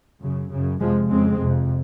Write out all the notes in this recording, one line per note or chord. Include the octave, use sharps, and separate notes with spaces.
F#2 C#3
F#2 C#3
F2 C3 F3 G#3
F2 C#3 G#3 C4
F2 C3